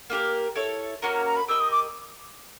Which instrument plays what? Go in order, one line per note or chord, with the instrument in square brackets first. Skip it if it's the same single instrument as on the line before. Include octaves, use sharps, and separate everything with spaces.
[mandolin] A#3 D#4 G4 A#4
E4 A4 C#5
[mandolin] A#3 C#4 F#4 A#4 [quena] A#5
[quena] A#5
A#5
B5
[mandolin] G4 A#4 D#5 [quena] E6
[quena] D#6
D6